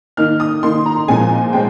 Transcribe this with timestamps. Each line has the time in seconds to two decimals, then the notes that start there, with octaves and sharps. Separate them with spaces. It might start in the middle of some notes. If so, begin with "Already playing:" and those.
0.17 D#3 A#3 D#4 F6
0.40 D#6
0.63 D#3 A#3 D#4 C6
0.86 A#5
1.08 A#2 F3 G#3 C4 G#5
1.53 G#3 C4 G5